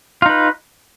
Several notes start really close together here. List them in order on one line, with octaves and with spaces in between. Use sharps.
F4 D#4 B4